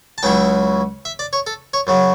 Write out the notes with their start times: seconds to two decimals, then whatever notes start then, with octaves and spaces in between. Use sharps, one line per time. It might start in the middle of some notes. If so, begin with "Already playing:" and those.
0.18 A5
0.23 C#2 C#3 F#3 C#4 E4 G5
1.05 E5
1.19 D5
1.33 C#5
1.47 A4
1.74 C#5
1.87 F#2 C#3 F#3